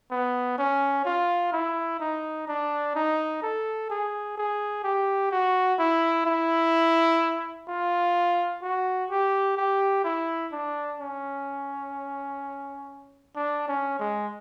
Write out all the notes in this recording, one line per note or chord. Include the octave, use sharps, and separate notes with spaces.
B3
C#4
F4
E4
D#4
D4
D#4
A4
G#4
G#4
G4
F#4
E4
E4
F4
F#4
G4
G4
E4
D4
C#4
D4
C#4
G#3